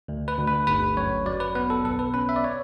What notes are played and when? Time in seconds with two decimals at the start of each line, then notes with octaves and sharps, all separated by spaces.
0.08 D2
0.28 B4
0.38 D2
0.47 B4
0.67 G1 B4
0.97 F#2 C#5
1.26 F#3 D5
1.40 B4
1.55 B3 B4
1.70 A4
1.84 B1 A4
1.99 B4
2.14 C#4 B4
2.29 E5
2.36 D5
2.44 C#5